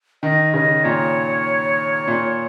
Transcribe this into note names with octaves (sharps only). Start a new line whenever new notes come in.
D#3 D#5
C#3 D#5
A#2 C#5
A#2